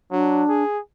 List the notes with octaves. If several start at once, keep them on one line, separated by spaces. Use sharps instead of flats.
F#3 D4
G#4